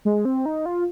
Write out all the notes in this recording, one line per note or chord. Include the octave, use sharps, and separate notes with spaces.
G#3
C4
D#4
F4